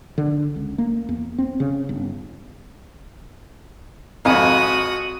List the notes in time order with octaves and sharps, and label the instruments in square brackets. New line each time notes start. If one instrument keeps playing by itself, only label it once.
[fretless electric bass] D3
C#2
A#3
E2
C4
C#3
G1
[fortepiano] G#1 F2 [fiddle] F#4 D#6